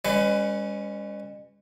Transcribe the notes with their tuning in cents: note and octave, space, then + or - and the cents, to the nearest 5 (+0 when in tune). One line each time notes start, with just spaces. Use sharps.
G#3 -45 C#4 +0 B4 +20